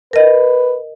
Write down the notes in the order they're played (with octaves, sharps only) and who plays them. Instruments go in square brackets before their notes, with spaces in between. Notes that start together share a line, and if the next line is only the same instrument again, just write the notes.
[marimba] A#4 D#5 [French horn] B4